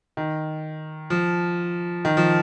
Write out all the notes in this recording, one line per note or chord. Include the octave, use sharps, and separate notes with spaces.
D#3
F3
D#3
F3